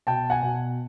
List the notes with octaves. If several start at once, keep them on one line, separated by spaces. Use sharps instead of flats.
B2 G5 A5
F#5 G#5
B2